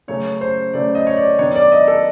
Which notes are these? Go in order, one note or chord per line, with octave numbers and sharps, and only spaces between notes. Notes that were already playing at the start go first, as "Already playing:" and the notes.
C#3 F#3 A3 C#4 C#5
C5
C#3 F#3 A3 C#4 D5
D#5
C#5
D5
D#3 F#3 B3 D4 C#5
D5
D#5
A4